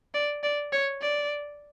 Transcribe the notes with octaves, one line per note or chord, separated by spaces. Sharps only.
D5
D5
C#5
D5